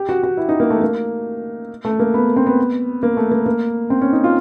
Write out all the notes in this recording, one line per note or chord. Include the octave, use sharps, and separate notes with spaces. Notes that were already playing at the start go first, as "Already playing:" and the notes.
Already playing: G4
F#4
F#4
E4
D#4
A#3
A3
A#3
A3
A#3
B3
C4
B3
A#3
A3
A#3
A#3
C4
C#4
D#4
F4